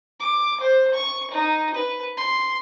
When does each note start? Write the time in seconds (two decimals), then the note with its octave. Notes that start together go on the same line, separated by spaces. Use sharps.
0.20 D6
0.60 C5
0.94 C#6
1.31 D#4
1.75 B4
2.17 C6